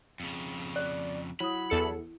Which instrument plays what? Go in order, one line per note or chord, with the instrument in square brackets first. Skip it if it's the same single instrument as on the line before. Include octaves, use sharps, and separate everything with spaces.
[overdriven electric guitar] F2 C#3
[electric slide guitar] D5 [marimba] F#6
[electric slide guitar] F#3 [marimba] E4 D#6 [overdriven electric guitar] B5
[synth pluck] E2 A4 C#7